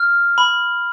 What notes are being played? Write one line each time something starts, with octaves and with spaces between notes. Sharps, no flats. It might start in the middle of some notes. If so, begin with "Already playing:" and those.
Already playing: F6
B5